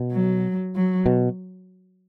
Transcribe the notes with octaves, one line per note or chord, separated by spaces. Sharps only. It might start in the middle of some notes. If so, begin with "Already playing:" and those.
Already playing: B2
F#3
F#3
B2